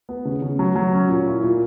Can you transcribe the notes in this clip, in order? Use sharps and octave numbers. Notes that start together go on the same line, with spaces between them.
B3
C#3
C#3
F#3
F#3
C#4
A#2
E4
A#2